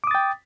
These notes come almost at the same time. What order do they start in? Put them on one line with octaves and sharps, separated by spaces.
D6 D#6 A6 G5